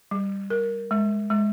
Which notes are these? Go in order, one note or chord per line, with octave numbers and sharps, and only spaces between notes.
G3
A#4
G#3
G#3